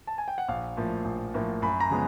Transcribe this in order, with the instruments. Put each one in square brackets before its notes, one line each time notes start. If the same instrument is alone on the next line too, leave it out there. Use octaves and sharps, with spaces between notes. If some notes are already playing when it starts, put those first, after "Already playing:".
[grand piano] A5
G#5
G5
F#5
A#1 F5
A2 F3 A#3
A#1
A2 F3 A#3
F#2 B5
A#5
C#3 F3 G#3 B3